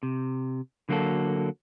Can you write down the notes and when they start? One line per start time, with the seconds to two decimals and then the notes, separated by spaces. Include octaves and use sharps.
0.03 C3
0.89 D3 F#3 A#3 B3 F#4 A4